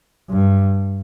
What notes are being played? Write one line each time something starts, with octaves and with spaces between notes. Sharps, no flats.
G2